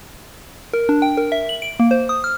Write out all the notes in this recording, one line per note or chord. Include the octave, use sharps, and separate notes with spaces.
A#4
D4
G5
A#4
E5
F#7
D7
A#3
C5
D#6
F6